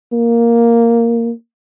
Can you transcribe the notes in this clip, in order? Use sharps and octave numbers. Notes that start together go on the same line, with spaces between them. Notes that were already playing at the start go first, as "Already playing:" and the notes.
A#3